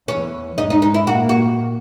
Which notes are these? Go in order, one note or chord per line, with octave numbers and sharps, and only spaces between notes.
E2 E3 C#4
G#2 G#3 D#4
D#4
D#4
E4
A#2 A#3 F#4
F#4